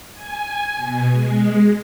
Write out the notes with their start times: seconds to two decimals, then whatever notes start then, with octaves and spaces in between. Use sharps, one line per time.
0.14 G#5
0.76 B2
1.11 G#3